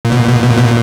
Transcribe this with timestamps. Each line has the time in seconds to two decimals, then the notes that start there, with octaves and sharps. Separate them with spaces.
0.05 A#2
0.12 B2
0.20 A#2
0.28 B2
0.35 A#2
0.44 B2
0.51 A#2
0.58 B2
0.66 A#2